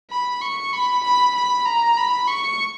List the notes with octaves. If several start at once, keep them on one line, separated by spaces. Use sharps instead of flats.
B5
C#6
B5
B5
B5
A#5
B5
C#6